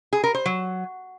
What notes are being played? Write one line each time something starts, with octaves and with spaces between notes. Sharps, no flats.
G#4
A#4
C5
F#3